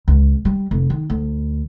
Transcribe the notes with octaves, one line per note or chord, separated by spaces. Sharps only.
C#2
G3
F1
D#3
D2